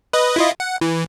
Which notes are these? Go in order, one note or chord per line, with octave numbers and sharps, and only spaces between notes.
B4 D#5
E4 F4 D#5
F#5
E3